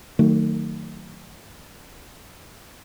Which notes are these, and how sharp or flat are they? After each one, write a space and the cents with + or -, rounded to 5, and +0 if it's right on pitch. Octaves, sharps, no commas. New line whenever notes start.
D#3 -5 F#3 +0 A3 +35